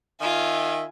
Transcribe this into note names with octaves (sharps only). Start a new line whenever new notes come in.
D#3 F4 E5 G#5